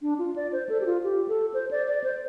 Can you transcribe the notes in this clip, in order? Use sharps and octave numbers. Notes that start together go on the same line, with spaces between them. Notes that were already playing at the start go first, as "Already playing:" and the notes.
D4
F4
D5
C5
A4
G4
F4
G4
A4
C5
D5
D5
C5